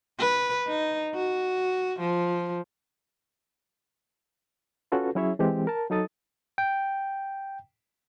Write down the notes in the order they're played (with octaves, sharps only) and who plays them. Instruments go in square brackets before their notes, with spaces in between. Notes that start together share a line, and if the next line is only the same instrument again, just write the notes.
[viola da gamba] B4
D#4
F#4
F3
[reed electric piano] C#4 F4 F#4 A4 B4
F#3 C#4 E4 G#4 C#5 E5
E3 G#3 C4 G4
A#4 A5
F#3 D#4 A4 D#6 A6
[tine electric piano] G5